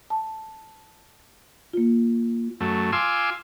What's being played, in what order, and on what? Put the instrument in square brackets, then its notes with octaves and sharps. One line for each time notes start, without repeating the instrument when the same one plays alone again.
[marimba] A5
A#3 F4
[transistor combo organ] F#2 A3
F4 G#5 C6 D6 E6